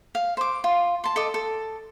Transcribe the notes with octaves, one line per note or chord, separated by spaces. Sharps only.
F5
C5 D6
F4
A5 C6
A4 D#5 D6
A4